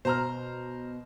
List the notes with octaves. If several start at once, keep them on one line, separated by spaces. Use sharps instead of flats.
B2 C5 A#5 F6